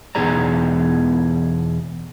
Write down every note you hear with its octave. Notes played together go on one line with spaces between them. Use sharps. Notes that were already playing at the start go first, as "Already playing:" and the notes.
E2 B2 D#4 G#4 D5 A#5